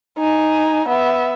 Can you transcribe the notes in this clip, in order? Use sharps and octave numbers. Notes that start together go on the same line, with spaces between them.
D#4 G#5
B3 E5